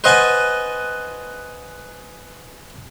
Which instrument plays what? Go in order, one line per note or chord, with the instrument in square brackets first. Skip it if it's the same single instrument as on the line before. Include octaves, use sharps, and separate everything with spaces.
[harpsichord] B4 C5 D#5 F#5 G#5 A5